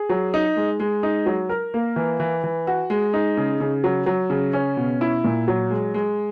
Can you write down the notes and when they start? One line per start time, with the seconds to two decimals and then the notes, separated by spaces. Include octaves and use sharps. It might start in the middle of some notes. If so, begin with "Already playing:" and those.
Already playing: G#4
0.09 F#3
0.34 D#4
0.57 G#3
0.80 G#3
1.03 D#4
1.26 F#3
1.49 A#4
1.74 A#3
1.96 E3
2.20 E3
2.44 E3
2.67 F#4
2.90 G#3
3.14 D#4
3.37 C#3
3.60 C#3
3.84 F#3
4.06 F#3
4.30 C#3
4.53 C#4
4.77 B2
5.01 E4
5.24 A#2
5.48 F#3
5.70 G#3
5.94 G#3